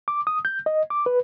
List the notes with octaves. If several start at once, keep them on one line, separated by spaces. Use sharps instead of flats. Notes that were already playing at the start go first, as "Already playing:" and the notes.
D6
D#6
G6
D#5
D6
B4